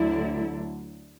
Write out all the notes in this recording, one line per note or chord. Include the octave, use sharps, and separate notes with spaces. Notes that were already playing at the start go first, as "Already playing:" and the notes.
Already playing: D2 D3 F#3 E4